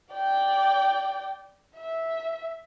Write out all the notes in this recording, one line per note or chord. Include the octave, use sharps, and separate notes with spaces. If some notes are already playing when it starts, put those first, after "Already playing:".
D5 G5
E5